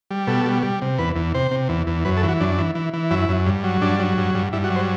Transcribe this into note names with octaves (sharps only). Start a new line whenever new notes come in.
G3
B2 A4
G3
G3
C3
E2 B4
E2
C3 C5
C3
E2
E2
F#2 B4
A4
E3
F#4
F#2 D4
E3
E3
E3
F#2 E4
F#2
G2
F#3
G2 D4
F#3
G2
G2
G2 E4
F#4
F#3
C5